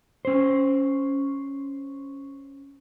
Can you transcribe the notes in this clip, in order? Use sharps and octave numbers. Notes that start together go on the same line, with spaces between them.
C#4 C5